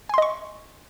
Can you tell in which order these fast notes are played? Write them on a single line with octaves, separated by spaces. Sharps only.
G#5 C6 D#5 C#6